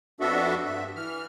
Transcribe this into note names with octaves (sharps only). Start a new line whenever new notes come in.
F2 B3 D4 F#4 A4 E5
G2 E5
E3 F6